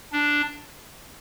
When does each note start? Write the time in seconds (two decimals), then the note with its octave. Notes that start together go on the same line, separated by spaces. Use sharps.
0.12 D4